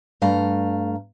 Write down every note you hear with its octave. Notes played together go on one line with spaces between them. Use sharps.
G2 A3 F5 A#5